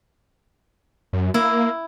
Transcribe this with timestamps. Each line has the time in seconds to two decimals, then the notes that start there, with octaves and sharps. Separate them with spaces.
1.13 F#2
1.34 A#3 E4